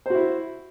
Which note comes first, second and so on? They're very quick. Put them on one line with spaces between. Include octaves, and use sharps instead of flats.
C5 F#4 E4